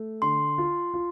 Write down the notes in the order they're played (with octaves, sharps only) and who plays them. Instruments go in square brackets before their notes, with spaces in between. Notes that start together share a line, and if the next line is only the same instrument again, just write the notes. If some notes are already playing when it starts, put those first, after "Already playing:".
Already playing: [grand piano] A3
[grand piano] D3 [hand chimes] C6
[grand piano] F4
F4